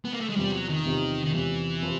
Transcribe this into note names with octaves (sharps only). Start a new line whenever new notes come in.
B3
A#3
A3
G#3
E2 C3 F3 G3
F#3
D#3
E2 C3 F3
D#3
E2 C3 E3 F3
C3 F3